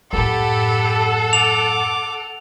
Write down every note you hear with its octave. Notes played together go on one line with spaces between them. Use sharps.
F#2 A2 G4 A4 F#5 B5
D6 F7